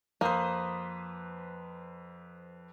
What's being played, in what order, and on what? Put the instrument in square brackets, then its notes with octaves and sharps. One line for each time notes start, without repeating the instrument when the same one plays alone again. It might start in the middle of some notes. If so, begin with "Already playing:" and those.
[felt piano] F2 [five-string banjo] A#3 [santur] B4 C5 D#6